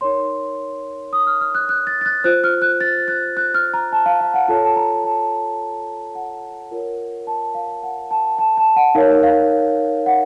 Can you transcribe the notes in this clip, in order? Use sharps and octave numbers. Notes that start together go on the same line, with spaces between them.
D#4 A#4 C#5 C6
D#6
F6
F6
F#6
F#6
A6
A6
F#6
F4 C5 F#6
F6
F#6
A6
F#6
F#6
F6
A#5
A5
F5
F5
F#5
F4 A4 C#5 A5
A5
A#5
A5
F#5
F4 A#4 C#5
A5
F5
F#5
A5
A5
A5
F#5
D#4 A#4 C#5 F5
F5
F#5